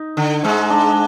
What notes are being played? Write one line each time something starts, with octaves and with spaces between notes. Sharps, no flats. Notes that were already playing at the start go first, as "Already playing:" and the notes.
Already playing: D#4
D3
G#2 G#3
D4